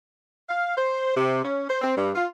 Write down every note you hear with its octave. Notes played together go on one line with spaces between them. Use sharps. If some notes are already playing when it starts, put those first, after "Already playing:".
F5
C5
C3
C#4
C5
C4
G2
F4